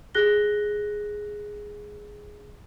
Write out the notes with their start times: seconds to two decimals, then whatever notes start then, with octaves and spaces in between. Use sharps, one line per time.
0.15 G4 G#4 F#6 A#6 G7